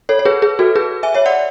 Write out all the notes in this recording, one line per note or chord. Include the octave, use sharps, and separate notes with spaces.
A4 C#5
C#5
G#4 B4
G#4 B4
F#4 A4
G#4 B4
E5 G#5
C#5 E5
D5 F#5